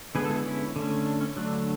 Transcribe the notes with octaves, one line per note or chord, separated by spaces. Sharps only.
D3 G#3 B3 G#4 B4
A4
E4 G#4
C#4 E4
D3 A3 C#4
D4
C#4
D3 F#3 A3 D4